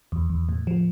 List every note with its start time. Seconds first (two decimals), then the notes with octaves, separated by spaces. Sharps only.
0.12 E2
0.30 E2
0.49 A2
0.67 F3